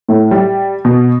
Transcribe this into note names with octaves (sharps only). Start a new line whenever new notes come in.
A2
G3
B2